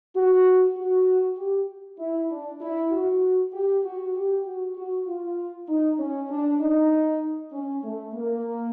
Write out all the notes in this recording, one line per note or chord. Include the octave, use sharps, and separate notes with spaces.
F#4
F#4
G4
E4
D4
E4
F#4
G4
F#4
G4
F#4
F#4
F4
D#4
C#4
D4
D#4
C#4
A3
A#3